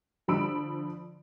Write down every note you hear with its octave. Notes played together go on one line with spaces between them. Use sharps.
D3 F3 B5 E6 D7